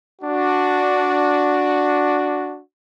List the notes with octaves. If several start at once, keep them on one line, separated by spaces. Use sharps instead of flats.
D4 F#4